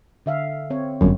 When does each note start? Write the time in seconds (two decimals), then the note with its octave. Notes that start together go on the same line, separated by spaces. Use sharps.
0.26 D3 E5 F5
0.70 C4 C#5
1.01 G1 F#2